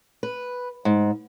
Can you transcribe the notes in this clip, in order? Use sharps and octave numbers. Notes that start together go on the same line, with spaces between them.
B4
G#2